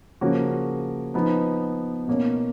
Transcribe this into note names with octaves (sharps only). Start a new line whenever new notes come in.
C#3 F3 A#3 C#4 F#4
F3 B3 D#4
B2 A#3 C#4